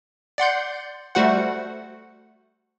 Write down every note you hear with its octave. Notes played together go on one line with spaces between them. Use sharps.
D5 F#5 C6 G6
G3 A3 F#4 C5 F#5